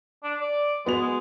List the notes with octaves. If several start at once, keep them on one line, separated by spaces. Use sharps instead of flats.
D4
D5
G#3 B3 F#4 F7
G#3